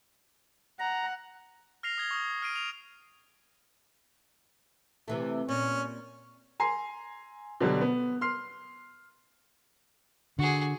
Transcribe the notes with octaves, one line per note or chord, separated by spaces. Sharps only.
F#5 A#5
F6 A#6 C7 F7
D#6 G#6 G7
C#6 D#6
F6 C7 D7 D#7
F7
C3 E3 A3
A#2 C#4
G#5 A#5 C6 C7
B2 D3 F#3 G3
B3
C6 F6 C7
D3 F#4 G#4